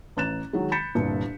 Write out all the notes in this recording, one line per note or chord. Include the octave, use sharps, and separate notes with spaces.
A1 A#5 F#6 A6 E7
D#3 F#3 G#3
B5 G6 A6 B6 C#7 E7
G1 C2 A#2